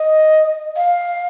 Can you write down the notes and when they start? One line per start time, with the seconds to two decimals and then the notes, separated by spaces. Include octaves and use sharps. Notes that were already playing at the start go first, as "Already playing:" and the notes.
Already playing: D#5
0.76 F5